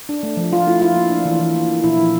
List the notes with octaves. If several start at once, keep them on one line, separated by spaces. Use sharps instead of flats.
D4
A3
F3
F3 F4
A3 E4
F3 F4
A#3
D4
E3
E3
A#3
E3
A#2 E4
F3